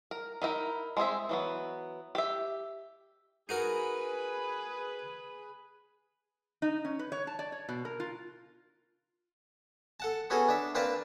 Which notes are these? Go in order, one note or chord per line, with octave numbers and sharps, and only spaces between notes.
A#4
D#4 E4 F#4 A#4
G#3 C4 G#4 E5
E3 F#3 B3
G4 E5
D#4 F#4 G#4 A#4 B4
D#4
C#4
B4
C#5
A5
D5
C#5
B2
A#4
F4
A4 F#5 A5
B3 C#4 F#4 G#4 A4
D4 E5
A#3 C4 D4 B4 D5 A5